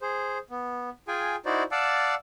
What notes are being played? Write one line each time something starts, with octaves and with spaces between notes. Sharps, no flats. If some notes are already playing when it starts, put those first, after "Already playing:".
G#4 C5
B3
F4 G#4 G5 G#5
D#4 E4 F#4 C5 D5
D5 F5 F#5 A5 D6 E6